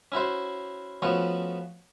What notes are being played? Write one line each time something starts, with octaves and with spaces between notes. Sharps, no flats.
C#4 E4 F#4 C5
F3 A3 B3 C#4 F#4 C#5